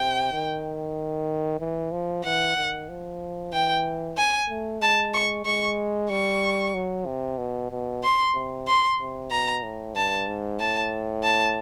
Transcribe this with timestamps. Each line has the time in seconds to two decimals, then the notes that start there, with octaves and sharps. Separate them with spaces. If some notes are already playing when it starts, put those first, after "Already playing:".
Already playing: C3 G5
0.32 D#3
1.60 E3
1.92 F3
2.24 E3 F#5
2.57 D#3
2.89 F3
3.53 E3 G5
4.17 G#5
4.49 A3
4.81 G#3 A5
5.14 C#6
5.45 G#3 C#6
6.10 G3 C#6
6.74 F#3
7.06 C3
7.38 B2
7.70 B2
8.03 C6
8.34 C3
8.67 C6
8.99 C3
9.31 B2 A#5
9.63 A2
9.95 G2 A5
10.27 G#2
10.60 A2 A5
11.23 A5